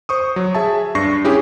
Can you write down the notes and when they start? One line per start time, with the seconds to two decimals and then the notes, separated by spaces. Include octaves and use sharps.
0.09 C5 C#6 D#6
0.36 F#3
0.55 G#4 E5 A5
0.95 G2 D4 C#6 A#6 C7
1.24 C#4 E4 G4 G#4